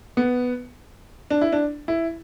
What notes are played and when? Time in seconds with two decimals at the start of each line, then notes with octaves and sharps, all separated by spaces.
0.17 B3
1.30 D4
1.41 E4
1.52 D4
1.88 E4